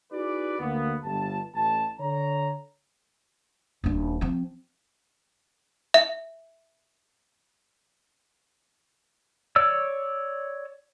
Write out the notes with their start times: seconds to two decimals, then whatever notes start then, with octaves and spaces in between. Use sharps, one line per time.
0.12 D#4 E4 F#4 G#4 B4 D5
0.59 D2 A#3 B3
1.04 G1 G2 A5
1.55 A1 A5
2.00 D3 C#5 A#5
3.84 D#1 D4
4.21 F3 C4
5.94 E5
9.56 C#5 D5 E6